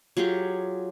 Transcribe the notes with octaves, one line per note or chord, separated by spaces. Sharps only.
F#3 F4 G4 G#4